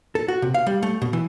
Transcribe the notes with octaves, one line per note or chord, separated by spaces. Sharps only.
A4
F#4
C3
F5
G3
A3
B2
E3